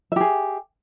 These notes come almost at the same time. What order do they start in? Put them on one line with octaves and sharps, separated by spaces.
E5 G4 G#4